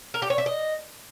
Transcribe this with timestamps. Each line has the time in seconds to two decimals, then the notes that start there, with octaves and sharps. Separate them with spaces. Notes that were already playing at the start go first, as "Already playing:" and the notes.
0.14 A#4
0.22 G4
0.30 C#5
0.38 E5
0.46 D#5